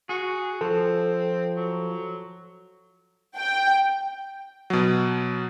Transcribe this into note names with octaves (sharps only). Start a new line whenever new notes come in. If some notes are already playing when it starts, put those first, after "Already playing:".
F#4 G#4
F3 C4 A4
F#3
G5
B2 F#3